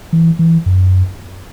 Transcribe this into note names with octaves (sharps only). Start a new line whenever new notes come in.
E3
E3
F#2